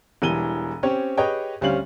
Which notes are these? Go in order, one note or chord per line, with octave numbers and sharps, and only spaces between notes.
E1 E3 G3 D#7 G7
C4 C#4 G4 C#5
G4 G#4 B4 C#5 D#5 G5
D2 G3 C4 C#4 F5 F#7